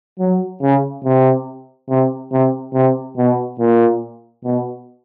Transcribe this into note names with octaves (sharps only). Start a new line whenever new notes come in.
F#3
C#3
C3
C3
C3
C3
B2
A#2
B2